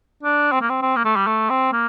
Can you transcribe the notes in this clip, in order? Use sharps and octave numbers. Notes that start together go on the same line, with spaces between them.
D4
C4
A#3
C4
C4
A#3
A3
G3
A3
C4
A#3